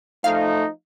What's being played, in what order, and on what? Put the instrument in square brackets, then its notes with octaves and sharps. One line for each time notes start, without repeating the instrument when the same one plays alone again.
[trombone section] F3 D#4 [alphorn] A3 [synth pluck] F5